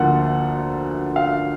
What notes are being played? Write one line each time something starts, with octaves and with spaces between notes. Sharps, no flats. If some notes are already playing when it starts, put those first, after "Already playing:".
Already playing: D2 D3 F3 A#3 F#5
F5